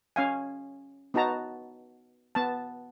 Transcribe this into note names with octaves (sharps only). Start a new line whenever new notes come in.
C#4 F5 G#5
B3 D#4 F#4 A5 A#5
B3 A5